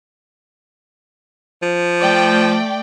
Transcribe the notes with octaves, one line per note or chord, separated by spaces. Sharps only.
F3
A3 D5 G5